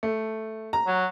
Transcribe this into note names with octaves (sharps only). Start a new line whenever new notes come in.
A3
A#5
F#3